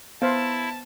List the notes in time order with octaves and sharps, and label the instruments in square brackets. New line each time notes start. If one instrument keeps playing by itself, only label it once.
[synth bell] B3 [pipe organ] E4 [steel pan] C5 F5 [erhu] A5